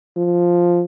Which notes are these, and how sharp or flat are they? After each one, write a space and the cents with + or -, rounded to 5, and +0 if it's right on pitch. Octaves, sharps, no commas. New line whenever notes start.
F3 +0